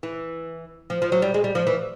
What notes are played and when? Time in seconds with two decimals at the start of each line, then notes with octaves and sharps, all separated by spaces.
0.03 E3
0.90 F3
1.02 F3
1.12 F#3
1.22 G3
1.34 G#3
1.44 G3
1.55 F3
1.67 E3